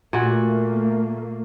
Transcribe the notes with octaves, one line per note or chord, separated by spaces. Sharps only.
A#2 A3 A#3 F#4